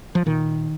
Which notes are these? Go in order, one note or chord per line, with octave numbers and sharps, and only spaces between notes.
F3
A#2 D#3